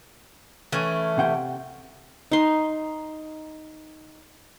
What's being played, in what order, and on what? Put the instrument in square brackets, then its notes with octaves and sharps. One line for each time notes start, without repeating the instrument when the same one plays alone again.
[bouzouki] E3 A3 C#4
[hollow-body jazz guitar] C3 F#5 G5
[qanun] D#4 C6